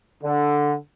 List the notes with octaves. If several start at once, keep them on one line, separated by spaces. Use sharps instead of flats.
D3